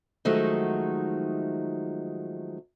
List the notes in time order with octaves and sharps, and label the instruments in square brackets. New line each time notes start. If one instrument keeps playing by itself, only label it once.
[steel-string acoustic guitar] D#3 F3 F#3 G#3 A3 D#4